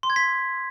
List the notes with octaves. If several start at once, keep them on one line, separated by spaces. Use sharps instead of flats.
C6
G#6
B6